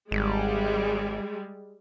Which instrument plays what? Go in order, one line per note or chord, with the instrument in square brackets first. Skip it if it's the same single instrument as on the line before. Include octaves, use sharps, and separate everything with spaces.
[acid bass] G#1 [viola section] G3 G#3